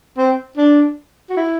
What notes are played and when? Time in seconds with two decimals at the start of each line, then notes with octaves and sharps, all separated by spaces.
0.17 C4
0.57 D4
1.30 F#4
1.37 E4